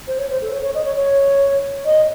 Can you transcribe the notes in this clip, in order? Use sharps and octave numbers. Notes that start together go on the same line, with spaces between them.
C5
C#5
C5
A4
C#5
C#5
D#5
C#5
C#5
D#5